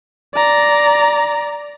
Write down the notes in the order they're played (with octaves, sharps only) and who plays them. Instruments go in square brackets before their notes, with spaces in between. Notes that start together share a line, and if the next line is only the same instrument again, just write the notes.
[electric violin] D5 A#5